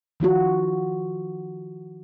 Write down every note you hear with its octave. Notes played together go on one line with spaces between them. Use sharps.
D#3 F3 F4 F#4